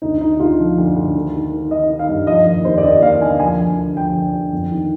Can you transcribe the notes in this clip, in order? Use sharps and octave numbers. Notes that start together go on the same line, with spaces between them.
D2 D#4
D3 D#4
D2 F4
F3
D2
D2
D#3
D#3
D#3
D#3 D#5
D#3
F5
G2
F3 D#5
D#2
D#2 C5
D5
D#2 D#5
D#2 F5
D3 G#5
F3 G#5
D2
D3
F3 G5
D3
D3
F2
D#3